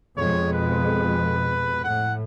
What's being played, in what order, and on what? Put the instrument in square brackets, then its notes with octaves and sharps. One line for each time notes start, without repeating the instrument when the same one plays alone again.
[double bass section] F2 B2 G#3 [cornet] C#5
[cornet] B4
[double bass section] A2 [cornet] F#5